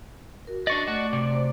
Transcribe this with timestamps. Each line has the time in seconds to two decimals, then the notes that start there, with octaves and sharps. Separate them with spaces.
0.47 F#4 A#4
0.67 D4 D5 D#5 C#6
0.88 A3 F#4 D5
1.13 C3 D5
1.32 C5